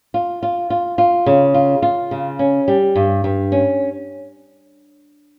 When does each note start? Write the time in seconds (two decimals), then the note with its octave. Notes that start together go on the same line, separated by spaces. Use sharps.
0.14 F4
0.43 F4
0.70 F4
0.98 F4
1.26 C#3
1.54 F4
1.82 F4
2.11 C#3
2.39 C#4
2.68 G3
2.95 G2
3.24 G2
3.52 C#4